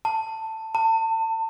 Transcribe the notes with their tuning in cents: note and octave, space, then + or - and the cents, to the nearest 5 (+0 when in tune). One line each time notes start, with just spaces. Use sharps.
A5 +15
A5 +35